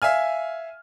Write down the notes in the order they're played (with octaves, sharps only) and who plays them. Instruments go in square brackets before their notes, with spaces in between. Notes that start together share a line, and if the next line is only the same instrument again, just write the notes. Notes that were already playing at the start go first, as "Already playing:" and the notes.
[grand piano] E5 F5 G#5 F6